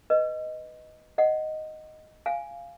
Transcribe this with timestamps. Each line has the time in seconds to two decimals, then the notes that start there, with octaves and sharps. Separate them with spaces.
0.10 B4 D#5
1.18 D#5 F#5
2.26 F5 G#5